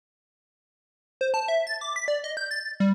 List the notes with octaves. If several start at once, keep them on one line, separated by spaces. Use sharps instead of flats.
C5
A5
E5
A6
D6
B6
D5
D#5
G6
A6
G3